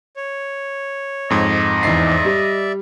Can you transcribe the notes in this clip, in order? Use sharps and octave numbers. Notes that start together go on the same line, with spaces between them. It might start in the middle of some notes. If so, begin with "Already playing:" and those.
C#5
F2 G#2 D#5
E2 D#4 D5 E5 C7
G3